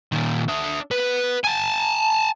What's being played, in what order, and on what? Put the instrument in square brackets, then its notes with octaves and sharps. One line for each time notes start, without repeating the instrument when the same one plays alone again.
[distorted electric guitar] A#2 D#3
D4 E5
B3 B4
G#5 A5